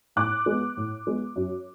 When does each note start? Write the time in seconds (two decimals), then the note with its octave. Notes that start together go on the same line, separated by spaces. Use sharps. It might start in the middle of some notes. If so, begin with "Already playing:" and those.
0.16 A2 D6 F#6
0.46 G#3 B3
0.77 A2
1.07 G#3 B3
1.36 F#2